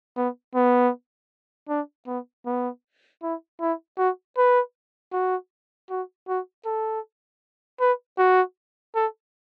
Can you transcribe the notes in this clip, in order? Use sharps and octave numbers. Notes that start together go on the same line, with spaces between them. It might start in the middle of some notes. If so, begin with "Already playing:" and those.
B3
B3
D4
B3
B3
E4
E4
F#4
B4
F#4
F#4
F#4
A4
B4
F#4
A4